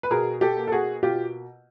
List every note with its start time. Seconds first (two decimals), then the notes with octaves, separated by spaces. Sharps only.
0.03 B4
0.11 B2 G#4 A#4
0.41 G4 A4
0.57 A#3
0.67 A4
0.72 F#4 G#4
1.03 B2 F4 G4